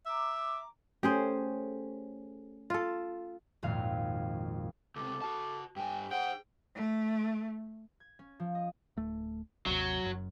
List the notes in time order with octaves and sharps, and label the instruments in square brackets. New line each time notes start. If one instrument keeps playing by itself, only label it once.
[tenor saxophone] E5 [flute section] A#5 D6
[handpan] A3 C#4 [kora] G4 G#4 C5
[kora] F4 A4
[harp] G#1 F2 A#2 F5
[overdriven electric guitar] C#2 C3 [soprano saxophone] A4 [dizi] D6
[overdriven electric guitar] F#4 A5
[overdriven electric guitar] G2 G#5 [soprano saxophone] G4 [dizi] G5
[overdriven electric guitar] G#4 C5 [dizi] F#5 [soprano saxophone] G5
[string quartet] A3
[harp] G#6
C#4
F3
D#5
[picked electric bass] D1 A3
[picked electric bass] G#1 D#2 C3 [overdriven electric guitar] F#3
[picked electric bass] F#1 F#2